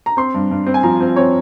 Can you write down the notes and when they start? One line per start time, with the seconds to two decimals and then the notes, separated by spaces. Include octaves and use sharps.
0.06 A#5
0.17 C4 C6
0.34 G2
0.51 G2
0.67 C4
0.74 G#5
0.83 F3 A#5
1.00 C4
1.16 C4 C#5